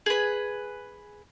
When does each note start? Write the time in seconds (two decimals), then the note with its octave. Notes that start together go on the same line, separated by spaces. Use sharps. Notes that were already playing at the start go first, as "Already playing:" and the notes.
0.06 G#4 B4